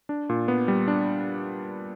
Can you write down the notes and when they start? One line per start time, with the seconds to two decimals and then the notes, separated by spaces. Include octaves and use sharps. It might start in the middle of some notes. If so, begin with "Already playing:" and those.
0.09 D4
0.29 A#2
0.48 B3
0.68 G3
0.88 D4